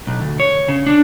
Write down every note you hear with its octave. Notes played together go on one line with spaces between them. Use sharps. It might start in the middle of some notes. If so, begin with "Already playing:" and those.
B1
D2
C#5
C#3
D4